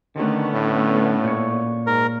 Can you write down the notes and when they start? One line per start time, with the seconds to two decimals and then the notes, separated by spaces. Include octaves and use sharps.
0.16 D3 D#3 A3 B3 C#4
0.52 A2
1.24 A#2 C#5
1.87 G#2 A#4